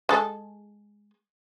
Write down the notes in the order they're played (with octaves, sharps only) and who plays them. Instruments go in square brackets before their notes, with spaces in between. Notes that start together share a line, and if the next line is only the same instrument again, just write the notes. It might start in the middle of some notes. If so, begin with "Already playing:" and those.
[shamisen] G#3 A4